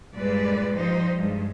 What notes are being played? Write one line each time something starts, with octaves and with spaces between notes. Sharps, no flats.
G2 A#2 G3 G#3 B4 D5
F3 G3 D#4 C5
G2 G#3